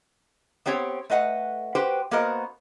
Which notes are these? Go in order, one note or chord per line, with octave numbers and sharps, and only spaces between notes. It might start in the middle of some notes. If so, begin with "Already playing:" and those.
B3 C4 G4 C#5
A3 B4 D#5 F#5
F#4 G4 B4 C5 G5
A#3 B3 F#4 A#4 C5 D#5